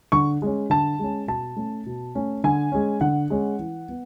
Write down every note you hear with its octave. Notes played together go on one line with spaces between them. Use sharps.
D3 C#6
G#3 C#4
D3 A5
G#3 C#4
B2 A5
A3 C#4
B2
A3 C#4
D3 G#5
G#3 C#4
D3 F#5
G#3 C#4
E3
B3